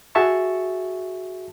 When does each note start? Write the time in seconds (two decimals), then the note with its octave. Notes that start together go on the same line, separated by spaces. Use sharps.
0.15 F#4 G#4 E5 A5 C#6